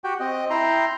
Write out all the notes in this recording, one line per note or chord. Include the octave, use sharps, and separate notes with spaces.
F#4 G4 G5
C4 D#5
E4 G5 A#5 C6